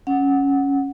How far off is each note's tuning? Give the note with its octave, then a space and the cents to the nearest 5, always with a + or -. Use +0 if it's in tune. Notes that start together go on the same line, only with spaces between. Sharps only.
C#4 +0 F#5 +0